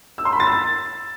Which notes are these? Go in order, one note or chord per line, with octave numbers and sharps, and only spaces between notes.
E6
C6
B5
A6
E6